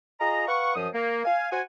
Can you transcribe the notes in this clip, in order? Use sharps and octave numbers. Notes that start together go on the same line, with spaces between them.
F4 G#4 D#5 A#5
B4 F5 F#5 C#6
F#2 F3 D#6
A#3
F5 G#5
F#4 C5 F#5 G#5